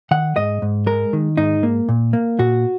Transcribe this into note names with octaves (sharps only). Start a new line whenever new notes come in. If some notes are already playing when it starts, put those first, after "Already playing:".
D#3 F#5
G#2 D#5
G#2
G#3 A#4
D#3
G#2 D#4
A#3
A#2
A#3
A#2 F#4